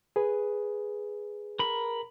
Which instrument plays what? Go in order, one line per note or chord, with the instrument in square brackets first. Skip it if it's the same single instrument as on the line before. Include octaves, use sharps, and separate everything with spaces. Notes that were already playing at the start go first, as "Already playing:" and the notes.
[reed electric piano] G#4 B4
[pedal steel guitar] A#4 B5